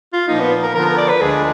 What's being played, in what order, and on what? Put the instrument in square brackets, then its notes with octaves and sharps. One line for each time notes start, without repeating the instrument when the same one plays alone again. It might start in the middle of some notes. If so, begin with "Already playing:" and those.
[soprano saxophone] F4
[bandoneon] A#2 F3 A#3 [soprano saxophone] D#4
[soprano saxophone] B3
A#4
[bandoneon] D3 F3 B3 F4 [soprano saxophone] A#4
[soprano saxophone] A#4
D5
B4
[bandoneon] D2 D3 F3 G#3 D4 [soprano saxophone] G#4